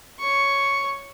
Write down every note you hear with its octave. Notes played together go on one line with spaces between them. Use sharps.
C#5 C#6